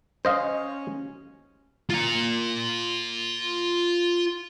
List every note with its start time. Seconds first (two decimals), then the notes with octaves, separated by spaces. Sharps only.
0.25 C#4 C5 D#5 F5
1.90 F4 A#5